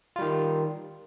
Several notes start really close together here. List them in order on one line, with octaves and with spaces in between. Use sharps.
F4 G3 D#3